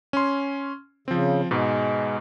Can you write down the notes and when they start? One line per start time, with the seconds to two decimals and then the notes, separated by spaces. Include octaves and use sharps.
0.13 C#4 C6
1.08 C#3 F3 C4
1.51 G#2 B2 G#3